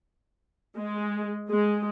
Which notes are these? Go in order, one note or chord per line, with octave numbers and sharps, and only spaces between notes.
G#3
G#3